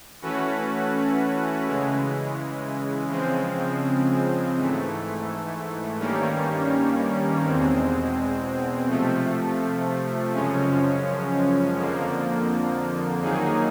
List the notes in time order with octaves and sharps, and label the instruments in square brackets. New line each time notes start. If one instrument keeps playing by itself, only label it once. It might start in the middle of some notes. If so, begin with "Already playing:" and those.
[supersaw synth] E3 A3 C#4 F#4 B4
C#3 E3 G#3
C#3 F3 G#3 C4
G#2 E3 A3
G2 D#3 G3 A#3 C#4
E2 B2 G#3 C4
C3 F3 A3
F#2 C#3 F3 G#3 C#4
F2 D3 F3 A#3
D#3 F#3 A#3 D#4 G#4